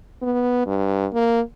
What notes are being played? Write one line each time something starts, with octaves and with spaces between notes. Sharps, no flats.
B3
G2
A#3